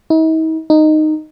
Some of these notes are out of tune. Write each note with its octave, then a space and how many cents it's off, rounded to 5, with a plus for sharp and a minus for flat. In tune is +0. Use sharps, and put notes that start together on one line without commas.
D#4 +45
D#4 -10